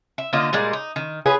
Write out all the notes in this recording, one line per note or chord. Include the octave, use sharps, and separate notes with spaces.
E5
D3 A#3 F4 D#5
A#2 G3 G#3 A#3
D#4
D#3
C#4 F4 G#4 B4